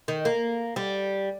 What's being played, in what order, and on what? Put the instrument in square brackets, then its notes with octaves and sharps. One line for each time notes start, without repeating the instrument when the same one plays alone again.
[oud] D#3
A#3
G3